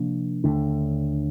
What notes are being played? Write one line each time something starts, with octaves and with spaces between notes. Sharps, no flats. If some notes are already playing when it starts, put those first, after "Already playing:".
Already playing: C3 F3 A#3 D4
D#2 D3 A3 D4